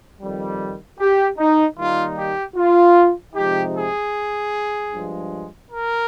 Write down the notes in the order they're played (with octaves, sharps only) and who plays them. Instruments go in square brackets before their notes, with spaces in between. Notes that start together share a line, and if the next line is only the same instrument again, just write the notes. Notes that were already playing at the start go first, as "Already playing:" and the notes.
[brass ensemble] F2 D#3 G3
G4
D#4
D#3 G3 A#3 D#4 F4
G4
F4
C3 F3 G#3 D#4 G4
G#4
G2 F3 G#3
A#4